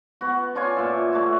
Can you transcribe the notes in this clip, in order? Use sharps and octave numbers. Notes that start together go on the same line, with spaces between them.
B3 F#4
D4 F4 C#5 G#5
A#2 E5
A3 F#4